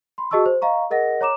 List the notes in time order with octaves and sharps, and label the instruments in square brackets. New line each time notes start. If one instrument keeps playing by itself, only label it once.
[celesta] B5 C6
F#4 G#4 D#5 A5 C#6 E6
C5
D#5 F5 A#5 C#6
G#4 A#4 D#5 F#5 A#6
C#5 A#5 D6 E7